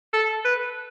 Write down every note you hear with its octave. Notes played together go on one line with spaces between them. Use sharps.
A4
B4